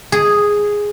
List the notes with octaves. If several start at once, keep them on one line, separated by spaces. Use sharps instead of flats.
G#4